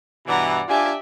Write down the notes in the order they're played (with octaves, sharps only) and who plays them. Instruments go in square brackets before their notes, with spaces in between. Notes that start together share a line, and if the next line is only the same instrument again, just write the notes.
[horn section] G2 B2 E3 [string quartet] D5 F#5 A#5
[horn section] D4 F4 G#5 [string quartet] G4 D5 E5